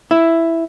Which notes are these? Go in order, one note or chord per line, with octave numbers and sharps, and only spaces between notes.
E4